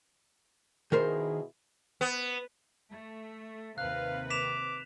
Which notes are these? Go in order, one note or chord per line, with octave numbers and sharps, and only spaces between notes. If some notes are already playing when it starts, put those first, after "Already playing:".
B2 D#3 E4 G#4 A#4 C5
B3
A3
D#2 C3 B4 F5 F#6
D6 B6 E7 F7